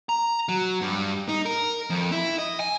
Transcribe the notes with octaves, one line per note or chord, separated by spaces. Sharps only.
A#5
F#3
G2
D#4
A#4
F2
E4
D#5
G#5